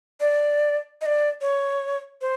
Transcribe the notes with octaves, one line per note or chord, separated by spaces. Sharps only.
D5
D#5
D5
C#5
C5